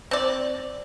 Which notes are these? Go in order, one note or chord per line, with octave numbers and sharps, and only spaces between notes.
C4 D5